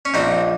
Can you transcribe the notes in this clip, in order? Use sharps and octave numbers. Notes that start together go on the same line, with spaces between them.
C#4
A#1 C4 D#4